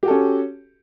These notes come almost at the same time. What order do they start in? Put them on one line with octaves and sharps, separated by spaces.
G4 F#4 A4 C#4